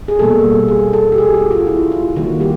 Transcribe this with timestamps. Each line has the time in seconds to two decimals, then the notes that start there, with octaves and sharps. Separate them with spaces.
0.08 G#4
0.19 B2 G3 A#3 A4
0.68 G#4
0.93 A4
1.12 G4
1.18 G#4
1.34 F#4
1.51 F4
1.67 E4
1.92 F4
2.16 D#3 G3 A#3 F#4
2.41 G4